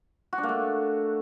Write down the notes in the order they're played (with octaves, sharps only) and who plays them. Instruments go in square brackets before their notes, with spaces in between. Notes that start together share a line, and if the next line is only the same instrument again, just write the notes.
[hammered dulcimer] F#4
D4
A#3
A3